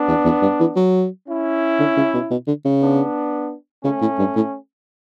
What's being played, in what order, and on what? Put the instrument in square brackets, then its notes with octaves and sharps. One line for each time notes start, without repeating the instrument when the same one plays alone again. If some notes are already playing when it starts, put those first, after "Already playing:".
Already playing: [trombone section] B3 D4
[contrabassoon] E2
E2
G2
E3
F#3
[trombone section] C#4 E4
[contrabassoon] D3
C#3
B2
B2
D3
C#3
[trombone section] B3 D4
[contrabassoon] C#3 [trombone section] A3 C#4
[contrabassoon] A2
G2
A2